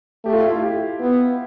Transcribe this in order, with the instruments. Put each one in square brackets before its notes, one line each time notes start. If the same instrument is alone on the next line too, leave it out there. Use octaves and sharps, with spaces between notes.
[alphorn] A3 [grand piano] G4
[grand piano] F4
E4
F4
G4
[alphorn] B3